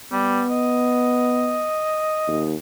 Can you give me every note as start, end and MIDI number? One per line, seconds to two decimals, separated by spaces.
0.12 0.44 55
0.12 1.73 59
0.50 2.49 75
2.28 2.55 39